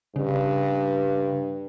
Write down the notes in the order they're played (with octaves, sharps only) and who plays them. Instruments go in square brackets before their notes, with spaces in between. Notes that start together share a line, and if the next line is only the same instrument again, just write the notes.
[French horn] G2 [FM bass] C#3